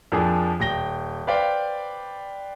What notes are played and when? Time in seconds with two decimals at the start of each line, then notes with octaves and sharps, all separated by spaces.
0.12 F2 F3 A#3 D4 G#4
0.60 D#1 G5 A#6 G7
1.27 B4 C5 D5 F5 G5